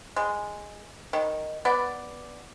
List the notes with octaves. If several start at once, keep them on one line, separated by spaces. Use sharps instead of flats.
G#3
D#3
B3 D5